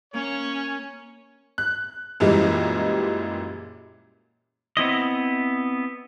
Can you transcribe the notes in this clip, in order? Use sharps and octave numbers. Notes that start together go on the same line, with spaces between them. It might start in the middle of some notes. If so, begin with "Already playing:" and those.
A#3 C#4 C#5
F#6
F#2 A#2 E3 G3 G#3
B3 C4 E4 D#5